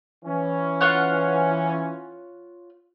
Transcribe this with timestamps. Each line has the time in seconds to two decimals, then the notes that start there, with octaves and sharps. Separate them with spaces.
0.25 E3 C#4
0.81 F4 C#5 F#5